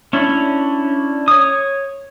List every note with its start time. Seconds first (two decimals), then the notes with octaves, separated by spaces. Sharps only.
0.13 C#4 D4 E4
1.28 C#5 D#6